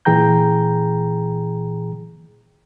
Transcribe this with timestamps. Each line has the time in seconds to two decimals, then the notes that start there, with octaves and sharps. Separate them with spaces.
0.05 A#2 E3 G#4 G5 A#5 G6